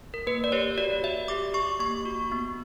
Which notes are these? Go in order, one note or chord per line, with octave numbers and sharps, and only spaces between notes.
A#4
A#3 B4
D5
G4 C#5
F#4 D5
F#4 E5
G4 D6
G4 C#6
A#3 C#6
F#4
B3